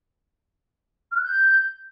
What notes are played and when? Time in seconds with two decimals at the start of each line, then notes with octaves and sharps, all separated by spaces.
1.11 F6
1.17 F#6
1.22 G6